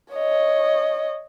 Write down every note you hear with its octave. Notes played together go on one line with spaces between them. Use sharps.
C#5 D#5